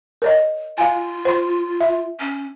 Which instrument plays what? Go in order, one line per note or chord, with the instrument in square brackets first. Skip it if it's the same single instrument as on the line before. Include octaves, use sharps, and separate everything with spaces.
[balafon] A#4 C#5 D#5
[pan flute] F4 [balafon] F5 G#5
[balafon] C5 C6
E5
[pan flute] C#4